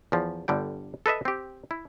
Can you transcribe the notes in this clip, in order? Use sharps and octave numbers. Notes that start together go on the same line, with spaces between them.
E2 F3
G1 D3 G3 G5
A4 B4 D#5 E5
C4 G4
E4